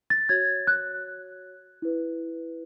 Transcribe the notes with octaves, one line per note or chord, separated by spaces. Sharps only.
A6
F#4 C#5 G#6
F#6
E4 B4